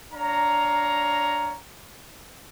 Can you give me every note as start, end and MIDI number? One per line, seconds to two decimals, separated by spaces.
0.13 1.56 62
0.13 1.56 73
0.13 1.56 77
0.13 1.56 82